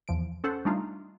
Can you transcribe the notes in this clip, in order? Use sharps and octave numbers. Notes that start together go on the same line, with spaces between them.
E2 F3 D7
C#4 A4 C5 F#5
G3 A3 D4 D#4 F4